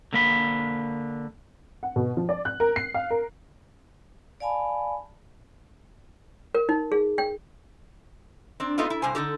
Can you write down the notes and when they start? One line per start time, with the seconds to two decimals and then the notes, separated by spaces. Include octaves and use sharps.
0.13 D3 A#3 B5
1.83 F#5
1.96 B2
2.17 F3
2.29 D5
2.45 F#6
2.60 A#4
2.76 C7
2.94 F5
3.10 A#4
4.40 D5 F5 G#5 A5 B5
6.55 A#4
6.69 D#4
6.92 G#4
7.18 G5
8.60 C4 D4
8.78 A3 B3 C4 D#4 F4
8.90 E4
9.02 G2 C3 C5 G#5
9.15 D3 D#4 G4 A4